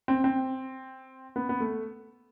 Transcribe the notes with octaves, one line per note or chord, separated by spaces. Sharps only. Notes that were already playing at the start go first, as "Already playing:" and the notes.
C4
C4
B3
B3
A3